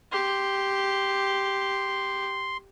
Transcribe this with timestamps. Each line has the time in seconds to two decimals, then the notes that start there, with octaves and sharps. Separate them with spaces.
0.12 G4 C6